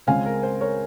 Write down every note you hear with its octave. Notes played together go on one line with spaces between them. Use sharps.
C#2 C#3 G#3 C4 F5 G#5
A#4
C5
A#4 C#5